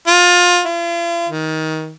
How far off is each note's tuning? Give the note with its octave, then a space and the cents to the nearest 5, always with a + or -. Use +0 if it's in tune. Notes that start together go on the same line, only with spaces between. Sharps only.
F4 +25
F4 -45
D#3 +20